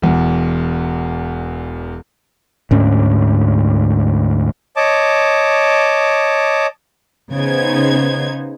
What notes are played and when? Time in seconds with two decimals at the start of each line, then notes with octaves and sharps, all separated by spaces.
0.02 E1 E2
2.71 D2 G#2 C#4
4.76 C#5 D#5 A5 D6
7.32 C#3 B3 D#4 C5 G#6